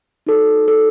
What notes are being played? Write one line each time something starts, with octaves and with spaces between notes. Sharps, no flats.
D#4 F#4 A4
A4